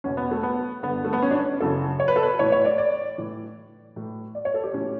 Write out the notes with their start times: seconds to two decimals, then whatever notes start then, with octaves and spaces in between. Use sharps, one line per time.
0.04 E2 B2 C#4
0.17 B3
0.31 A3
0.43 B3
0.83 G2 D3 B3
1.05 A3
1.13 B3
1.22 C#4
1.31 D4
1.35 C#4
1.60 F#2 C#3 E3 A4
2.00 C#5
2.08 B4
2.16 A4
2.23 B4
2.39 A2 E3 C#5
2.52 C#5
2.65 D5
2.78 D5
3.18 A2 E3
3.96 A2 E3
4.35 D5
4.45 C#5
4.54 A4
4.63 G4
4.73 A2 E3 C#4